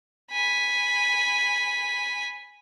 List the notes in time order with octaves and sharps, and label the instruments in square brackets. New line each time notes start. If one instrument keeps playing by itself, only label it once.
[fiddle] G#5 B5